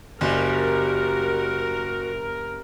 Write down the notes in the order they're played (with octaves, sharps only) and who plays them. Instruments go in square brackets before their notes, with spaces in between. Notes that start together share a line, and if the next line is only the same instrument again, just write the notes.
[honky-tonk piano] F#1 [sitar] G3 [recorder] F#4 [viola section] A#4